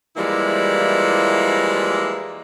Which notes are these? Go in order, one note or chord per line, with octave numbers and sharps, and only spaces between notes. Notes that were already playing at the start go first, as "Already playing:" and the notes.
E3 F3 G3 G#3 A#3 E4